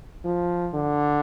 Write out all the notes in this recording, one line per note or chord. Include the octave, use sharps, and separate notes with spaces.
F3
D3